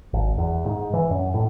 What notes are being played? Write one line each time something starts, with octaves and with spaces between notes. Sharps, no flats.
G#1
E2
G#2
E3
F#2
A2